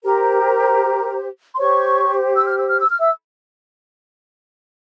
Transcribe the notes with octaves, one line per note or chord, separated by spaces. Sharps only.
G4 A#4 C5 A#5
C6
G4 C5 C#5 C#6
E6
F6
E6
F6
E6
F6
E5 E6